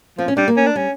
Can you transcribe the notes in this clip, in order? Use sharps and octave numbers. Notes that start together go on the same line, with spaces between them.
F3 C4
C#4
G3 D4
A#3
C#4
D4
G3 C#4